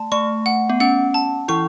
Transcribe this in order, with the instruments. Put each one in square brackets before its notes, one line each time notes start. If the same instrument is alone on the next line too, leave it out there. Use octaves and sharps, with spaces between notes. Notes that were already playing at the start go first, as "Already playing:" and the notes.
Already playing: [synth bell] A3 [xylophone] A5
[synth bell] A3 [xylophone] C#6
[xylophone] F#5
[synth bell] B3
[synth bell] C#4 [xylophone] F#5
[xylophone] A5
[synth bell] E3 E4 [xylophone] C#6